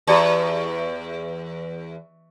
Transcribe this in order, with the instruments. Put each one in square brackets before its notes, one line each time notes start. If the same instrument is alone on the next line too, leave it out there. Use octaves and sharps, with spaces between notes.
[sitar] E2 [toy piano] G4 D5 A5